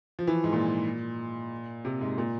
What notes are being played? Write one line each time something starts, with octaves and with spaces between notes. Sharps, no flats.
F3
E3
G#2
A#2
C3
G#2
A#2